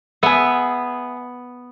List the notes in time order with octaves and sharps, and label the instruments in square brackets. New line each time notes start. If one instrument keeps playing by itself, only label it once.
[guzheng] B3 [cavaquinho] G#4 E5